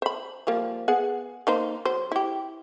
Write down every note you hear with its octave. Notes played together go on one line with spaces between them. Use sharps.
C5 B5
F3 G3 A#3
B3 G#4 F#5
A#3 D#4 C5
F#3 C5
E4 G4